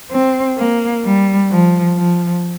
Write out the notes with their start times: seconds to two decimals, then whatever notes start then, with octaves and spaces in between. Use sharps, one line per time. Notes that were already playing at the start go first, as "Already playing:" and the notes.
0.12 C4
0.58 A#3
1.05 G3
1.51 F3
1.97 F3